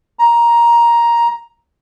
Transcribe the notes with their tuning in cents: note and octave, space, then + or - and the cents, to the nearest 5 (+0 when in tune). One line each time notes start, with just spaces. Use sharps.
A#5 +10